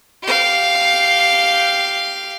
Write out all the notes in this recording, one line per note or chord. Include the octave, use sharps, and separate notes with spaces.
G4 F5